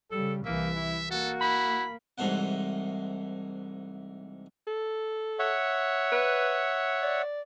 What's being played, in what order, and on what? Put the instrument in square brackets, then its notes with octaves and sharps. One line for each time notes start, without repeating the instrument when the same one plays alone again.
[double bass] C#3 G3 [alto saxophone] A4
[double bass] C2 E3 [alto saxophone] A#3 [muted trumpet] E5
[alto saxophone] E4
[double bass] A#3 [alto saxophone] F#4 [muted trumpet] A4
[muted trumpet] E4 [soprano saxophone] B5
[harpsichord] C2 G#2 E3 A3 C5 F#5
[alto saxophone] A4
[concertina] C#5 E5 F#5
[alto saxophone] B4
D5